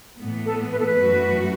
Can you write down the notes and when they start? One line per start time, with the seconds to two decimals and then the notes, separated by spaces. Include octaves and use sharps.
0.19 A2 E3 B3
0.45 A4
0.72 B4
0.79 A4
0.86 B4
0.99 F#2 E3 A3 F#4